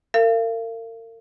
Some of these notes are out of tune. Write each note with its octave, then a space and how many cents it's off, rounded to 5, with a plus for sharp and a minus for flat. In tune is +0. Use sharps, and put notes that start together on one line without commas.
A#4 -40 F5 -40